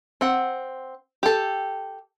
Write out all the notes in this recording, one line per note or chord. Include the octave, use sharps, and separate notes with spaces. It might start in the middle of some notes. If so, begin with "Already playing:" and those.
C4 F#5
G4 A4